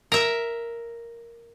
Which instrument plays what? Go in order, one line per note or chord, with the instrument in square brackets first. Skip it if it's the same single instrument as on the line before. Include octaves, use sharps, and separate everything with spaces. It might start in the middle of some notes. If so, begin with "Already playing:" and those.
[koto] A#4 E5